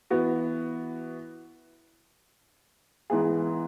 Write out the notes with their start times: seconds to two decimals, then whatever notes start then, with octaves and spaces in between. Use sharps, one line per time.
0.10 E3 B3 F#4
3.10 G#2 E3 B3 G#4